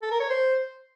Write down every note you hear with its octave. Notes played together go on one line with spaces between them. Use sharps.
A4
A#4
C#5
C5